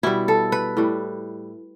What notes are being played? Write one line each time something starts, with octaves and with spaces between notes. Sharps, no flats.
B2 G3 E4
A4
B4
A2 G3